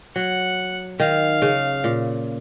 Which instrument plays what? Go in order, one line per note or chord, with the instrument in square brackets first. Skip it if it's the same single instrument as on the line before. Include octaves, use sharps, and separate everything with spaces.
[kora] F#3 [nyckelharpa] F#5
[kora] D#3 [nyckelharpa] F5
[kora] C#3
A#2